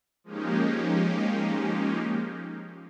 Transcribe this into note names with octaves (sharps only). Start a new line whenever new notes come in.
F3 G#3 A#3 C#4 D#4 G4